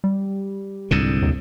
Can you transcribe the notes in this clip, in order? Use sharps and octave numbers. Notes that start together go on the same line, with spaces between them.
G3
C2 G#2 D3
D#2